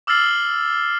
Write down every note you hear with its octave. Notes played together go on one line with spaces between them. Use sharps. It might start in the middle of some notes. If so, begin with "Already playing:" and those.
D6 E6 F6 A6 C7 F#7